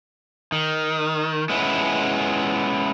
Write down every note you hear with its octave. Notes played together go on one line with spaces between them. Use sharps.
D#3
G#3 B3 C#4 E4